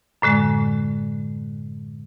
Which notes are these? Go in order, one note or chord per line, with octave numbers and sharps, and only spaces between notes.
F#2 A2 D3 G#3